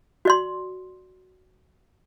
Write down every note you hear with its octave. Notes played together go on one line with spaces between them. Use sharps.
F#4 D5 C6